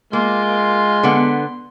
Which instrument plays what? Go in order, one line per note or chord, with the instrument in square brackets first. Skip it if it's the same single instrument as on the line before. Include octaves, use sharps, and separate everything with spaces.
[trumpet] G#3 [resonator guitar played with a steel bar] A#3 [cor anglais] F4 [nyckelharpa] C6
[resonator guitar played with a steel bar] D3 B3